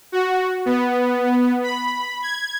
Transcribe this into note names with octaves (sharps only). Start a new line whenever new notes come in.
F#4
B3
B5
G#6